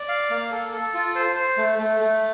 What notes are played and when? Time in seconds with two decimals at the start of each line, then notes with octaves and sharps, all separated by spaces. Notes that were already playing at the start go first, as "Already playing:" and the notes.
Already playing: D5
0.08 F5
0.30 A#3
0.51 A4
0.72 A4
0.94 F4
1.15 C5
1.36 C5
1.57 A3
1.79 A3
2.00 A3